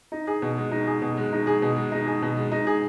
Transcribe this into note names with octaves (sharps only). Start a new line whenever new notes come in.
D#4
G#4
B2
G#3
D#4
G#4
B2
G#3
D#4
G#4
B2
G#3
D#4
G#4
B2
G#3
D#4
G#4